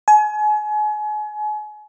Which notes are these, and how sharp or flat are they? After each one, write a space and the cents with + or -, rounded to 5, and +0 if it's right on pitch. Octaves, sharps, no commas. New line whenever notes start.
G#5 +35